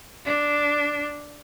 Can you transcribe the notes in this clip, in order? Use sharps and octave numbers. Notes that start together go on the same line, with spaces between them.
D4